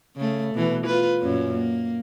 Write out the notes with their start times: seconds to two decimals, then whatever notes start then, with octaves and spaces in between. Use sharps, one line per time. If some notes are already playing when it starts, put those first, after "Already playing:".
0.16 C#3 A3
0.55 B2 E3
0.87 F4 B4
1.20 F#2 A#2 C#4
1.54 A#3